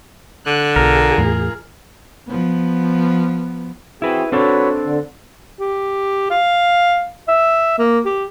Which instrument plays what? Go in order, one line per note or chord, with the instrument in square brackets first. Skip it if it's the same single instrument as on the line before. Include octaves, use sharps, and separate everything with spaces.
[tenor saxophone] D3 [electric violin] F#6
[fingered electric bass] B1 [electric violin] F4 G#4 [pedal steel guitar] A#4
[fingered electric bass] E2 A2
[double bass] F3 B3
[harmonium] C4 F#4 G#4 [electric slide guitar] E4 B4
[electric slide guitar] C4 D4 A4 [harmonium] F#4 B4 C#5
[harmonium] D3
[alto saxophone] G4
F5
E5
A#3
G4